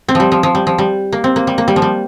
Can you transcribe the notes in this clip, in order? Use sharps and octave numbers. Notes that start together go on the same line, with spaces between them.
C4
F3 G3
F3
F3
G3
F3
G3
A#3
C4
A#3
G3
A#3
G3
F3
G3